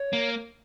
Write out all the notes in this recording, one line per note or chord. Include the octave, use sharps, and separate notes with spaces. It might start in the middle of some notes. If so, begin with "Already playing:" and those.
Already playing: C#5
A#3